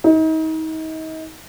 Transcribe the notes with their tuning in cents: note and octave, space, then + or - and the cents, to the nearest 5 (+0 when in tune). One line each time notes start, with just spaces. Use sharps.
D#4 +35